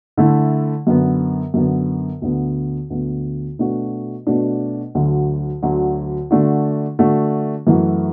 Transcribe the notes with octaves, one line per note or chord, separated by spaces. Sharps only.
D3 A3 E4
F#2 D3 B3
F#2 D3 B3
D2 D3 B3
D2 D3 B3
B2 A3 D4 F#4
B2 A3 D4 F#4
D2 D3 F#3
D2 D3 F#3
D3 A3 D4 F#4
D3 A3 D4 F#4
F#2 E3 A3 F#4